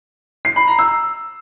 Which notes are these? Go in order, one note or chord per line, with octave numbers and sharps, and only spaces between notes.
C7
B5
A#5
E6